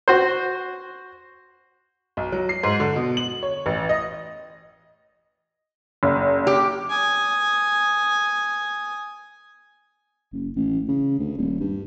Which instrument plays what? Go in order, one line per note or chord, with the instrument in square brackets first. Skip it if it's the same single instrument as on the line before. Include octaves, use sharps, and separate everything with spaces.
[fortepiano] F#4 C5
[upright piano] B1
F#3
C7
G#2
D3
B2
F#7
C#5
A1
D#5
[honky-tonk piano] F#1
[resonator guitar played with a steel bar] G4
[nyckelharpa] G#5 D#6
[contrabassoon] F#1
A1
C#3
D2
D#1
G2